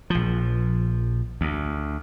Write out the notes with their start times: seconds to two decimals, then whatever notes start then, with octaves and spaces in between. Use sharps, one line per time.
0.10 A#1 F3
1.41 D2